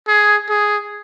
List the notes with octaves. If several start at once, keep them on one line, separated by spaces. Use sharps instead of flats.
G#4
G#4